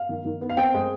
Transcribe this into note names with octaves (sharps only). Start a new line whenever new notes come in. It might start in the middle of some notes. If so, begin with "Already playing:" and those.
Already playing: F5
D#3
D#3
B3
F5
C4 G5
G#3